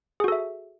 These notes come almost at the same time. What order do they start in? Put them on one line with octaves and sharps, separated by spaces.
G#4 F#4 A4 E5